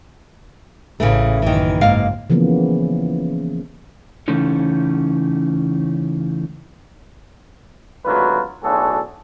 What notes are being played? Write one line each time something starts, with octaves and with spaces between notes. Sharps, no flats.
A1 A2 C#3 E3 A3
F#1 D#3 E3
G#2 A#3 F5
C#3 E3 F3 A#3 B3
C#3 E3 A3 C#4 D#4
G#1 D2 F#3 F4 B4
B1 A2 D4 F#4 G#4 A4